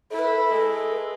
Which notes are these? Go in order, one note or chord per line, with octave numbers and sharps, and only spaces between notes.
E4 A4
B4
A4
G#3
B4